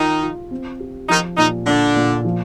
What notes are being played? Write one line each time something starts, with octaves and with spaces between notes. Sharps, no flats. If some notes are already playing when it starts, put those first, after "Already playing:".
Already playing: D#3 D#4 F4
F4
C4
G4
D#3 F3 D#4
A#2 D#3 D#4
A#2 D3 D4
A#2
F3